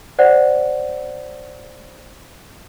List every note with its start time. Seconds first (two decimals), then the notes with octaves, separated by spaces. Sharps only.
0.19 C5 D5 F#5